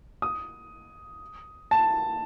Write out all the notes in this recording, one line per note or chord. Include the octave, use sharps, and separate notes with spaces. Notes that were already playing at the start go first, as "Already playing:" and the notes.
D#6
A5